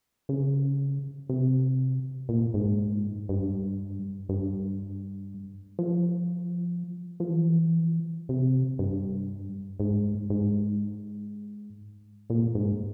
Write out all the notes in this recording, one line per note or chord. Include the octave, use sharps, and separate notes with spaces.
C#3
C3
A#2
G#2
G2
G2
F3
F3
E3
C3
G2
G#2
G#2
A#2
G#2